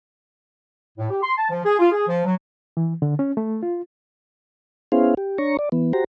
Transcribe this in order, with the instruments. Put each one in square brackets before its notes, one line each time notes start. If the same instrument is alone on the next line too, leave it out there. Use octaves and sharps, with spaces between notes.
[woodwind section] A2
G4
C6
A5
F3
G#4
F4
G#4
F3
F#3
[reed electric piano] E3
D3
C#4
A3
F4
[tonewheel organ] B3 C#4 E4 G#4 C5 F5
G4
D4 C#5 A#5 C#6
D5
E3 B3
F#4 G4 C5 A#5